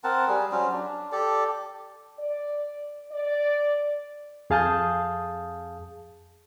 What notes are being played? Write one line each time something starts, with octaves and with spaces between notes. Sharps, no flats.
C4 A#4 F#5 A5
G3 G#4
F#3 C#4 C5
D4
G4 A4 D5
D5
D5
F2 G#4 F5 A5 D#6 G6